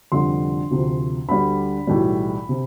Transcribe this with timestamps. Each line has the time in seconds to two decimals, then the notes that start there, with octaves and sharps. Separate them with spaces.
0.12 F1 F2 D3 G3 C6
0.71 D2 C3 F3
1.28 D2 D3 G3 B5
1.87 B1 A2 E3 G3
2.49 C3